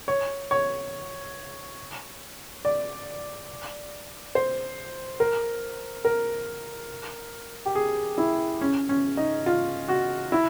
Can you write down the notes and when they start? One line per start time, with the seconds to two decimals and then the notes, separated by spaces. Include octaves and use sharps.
0.08 C#5
0.51 C#5
2.65 D5
4.35 C5
5.20 A#4
6.05 A#4
7.66 G4
7.75 G#4
8.18 E4
8.61 C#4
8.89 C#4
9.17 D#4
9.46 F4
9.88 F#4
10.32 E4